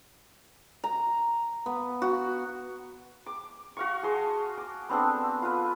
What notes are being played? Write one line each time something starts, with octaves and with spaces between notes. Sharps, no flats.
A#5
B3
F#4
D6
F#4 F5 C#6
G#4 A5 C6
D6
B3 C4 D4 A4
F4 B4